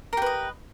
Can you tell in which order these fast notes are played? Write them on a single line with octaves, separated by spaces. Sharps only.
A#4 G4 B4 D#5